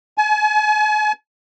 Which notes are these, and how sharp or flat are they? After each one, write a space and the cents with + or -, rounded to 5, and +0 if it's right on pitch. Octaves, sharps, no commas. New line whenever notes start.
G#5 +45